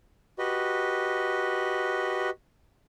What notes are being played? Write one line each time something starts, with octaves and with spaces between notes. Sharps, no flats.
F#4 G4 B4 D#5